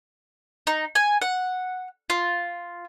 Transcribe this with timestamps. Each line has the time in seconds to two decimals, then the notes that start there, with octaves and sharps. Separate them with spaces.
0.67 D#4
0.95 G#5
1.22 F#5
2.10 F4